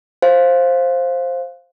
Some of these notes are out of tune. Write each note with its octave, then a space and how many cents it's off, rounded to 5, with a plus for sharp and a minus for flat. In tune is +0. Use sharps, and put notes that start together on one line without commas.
C5 +10 F5 +0